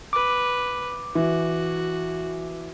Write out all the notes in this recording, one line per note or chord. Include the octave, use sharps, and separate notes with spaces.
B4 D6
E3 F#4